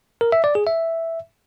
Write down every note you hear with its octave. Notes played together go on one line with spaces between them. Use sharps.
A#4
E5
D5
G#4
E5